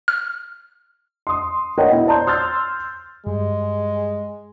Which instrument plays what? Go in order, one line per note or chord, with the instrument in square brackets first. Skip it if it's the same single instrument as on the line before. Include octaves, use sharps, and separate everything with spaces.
[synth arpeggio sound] F6
[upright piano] C6 D#6
A#4 B4 C#5 D#5 F#5 G5
B2 E4
C5 D5 A5 A#5 C6 G6
C6 E6 F6 G6 A6
[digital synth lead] G2 [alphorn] G#3